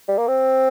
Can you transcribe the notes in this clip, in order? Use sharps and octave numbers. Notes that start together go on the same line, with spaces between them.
G3
A#3
C4